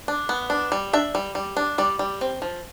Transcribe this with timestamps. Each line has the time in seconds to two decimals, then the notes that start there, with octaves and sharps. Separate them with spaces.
0.08 D4
0.29 B3
0.50 D4
0.72 G3
0.93 D4 E5
1.15 G3
1.35 G3
1.57 D4
1.78 G3 D5
1.99 G3
2.21 C4
2.42 F3